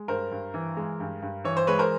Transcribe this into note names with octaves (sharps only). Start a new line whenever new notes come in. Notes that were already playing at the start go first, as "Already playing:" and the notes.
Already playing: G#3
G2 A#4 C5
G2
E3
G#3
G2
G2
E3 C#5
C5
G#3 B4 C#5
A#4 C5